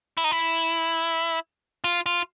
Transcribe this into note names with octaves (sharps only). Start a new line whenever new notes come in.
E4
D#4
E4
F4
F4